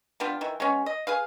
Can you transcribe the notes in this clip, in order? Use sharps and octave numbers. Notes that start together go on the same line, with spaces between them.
G3 B3 D4 F4
D#3 E3
G#3 B3 C#4
D#5
G#4 B4 F5